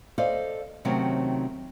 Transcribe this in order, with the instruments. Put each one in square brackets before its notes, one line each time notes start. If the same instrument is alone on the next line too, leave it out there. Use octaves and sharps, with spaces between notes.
[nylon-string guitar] A4 C5 D5 D#5 F5
C3 D#3 F#3 A3 C4 C#4